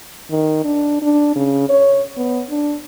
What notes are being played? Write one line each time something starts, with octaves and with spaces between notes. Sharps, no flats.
D#3
D4
D4
C#3
C#5
B3
D4